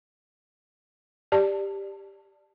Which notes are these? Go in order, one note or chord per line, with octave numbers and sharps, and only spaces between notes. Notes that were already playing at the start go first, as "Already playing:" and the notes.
G4 D5 A5